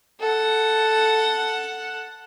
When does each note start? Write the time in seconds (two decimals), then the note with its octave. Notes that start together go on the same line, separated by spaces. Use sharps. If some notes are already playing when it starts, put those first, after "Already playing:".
0.20 A4 F#5